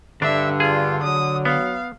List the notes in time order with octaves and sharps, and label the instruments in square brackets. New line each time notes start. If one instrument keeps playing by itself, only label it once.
[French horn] G2 [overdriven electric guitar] D3 [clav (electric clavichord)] D4 [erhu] E5
[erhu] F4 [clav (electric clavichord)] G#4
[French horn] F#3 [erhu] D#6
[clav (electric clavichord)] B3 [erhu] F5